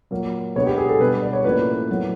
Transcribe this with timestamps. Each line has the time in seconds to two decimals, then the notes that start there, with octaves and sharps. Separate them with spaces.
0.11 A#2 F#3 A#3
0.56 B2 G#3 B3 D4 C#5
0.67 G4
0.78 G#4
0.89 A4
1.00 B2 G3 B3 D4 B4
1.22 D5
1.33 C#5
1.44 A2 F3 A#3 C#4 B4
1.88 A2 F#3 B3